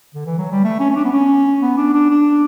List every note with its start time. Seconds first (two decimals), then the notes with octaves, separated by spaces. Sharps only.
0.15 D3
0.26 E3
0.38 F#3
0.51 G3
0.64 A3
0.79 C#4
0.90 C#4
0.95 D4
1.04 B3
1.13 C#4
1.62 B3
1.77 D4
1.93 D4
2.10 D4